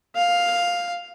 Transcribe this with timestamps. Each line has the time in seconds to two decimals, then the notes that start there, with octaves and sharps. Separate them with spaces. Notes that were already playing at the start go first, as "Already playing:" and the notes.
0.16 F5